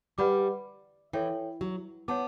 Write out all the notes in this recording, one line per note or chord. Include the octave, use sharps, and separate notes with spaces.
G3 B4 D5 F#5 B5 D6
E3 A4 C#5 E5 G5
F#3
B3 C#5 F#5 A5 D6